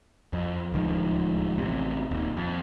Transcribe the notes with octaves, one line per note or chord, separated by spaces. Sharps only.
F2
D1 C#2 D#3 F3
A1 C3
D#1 D#2
F2